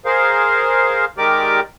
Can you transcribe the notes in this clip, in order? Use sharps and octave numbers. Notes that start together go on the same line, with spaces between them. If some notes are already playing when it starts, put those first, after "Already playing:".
G#4 A#4 C5 F5
D#3 G#3 G4 A#4 D5 D6